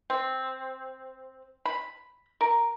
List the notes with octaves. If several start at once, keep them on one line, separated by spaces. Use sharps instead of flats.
C4
B5
A#4